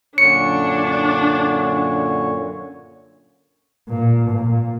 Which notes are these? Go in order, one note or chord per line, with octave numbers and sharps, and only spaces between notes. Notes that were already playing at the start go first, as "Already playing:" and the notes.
F#2 A#2 D3 D4 C#5 C#7
A#2
A#2